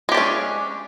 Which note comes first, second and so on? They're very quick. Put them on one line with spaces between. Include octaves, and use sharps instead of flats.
G#3 G4 D4 C#4